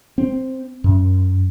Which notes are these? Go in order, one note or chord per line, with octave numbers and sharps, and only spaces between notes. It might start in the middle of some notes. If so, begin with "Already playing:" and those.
C4
F#2